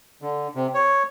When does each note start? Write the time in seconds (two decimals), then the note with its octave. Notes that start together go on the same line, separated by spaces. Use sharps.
0.22 D3
0.55 C3
0.74 C#5